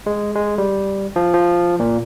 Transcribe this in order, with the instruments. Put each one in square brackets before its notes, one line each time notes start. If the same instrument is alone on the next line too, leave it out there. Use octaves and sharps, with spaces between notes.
[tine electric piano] G#3
G#3
G3
F3
F3
A#2